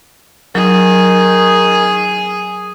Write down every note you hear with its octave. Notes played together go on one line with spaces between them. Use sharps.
D#3 F#3 G#4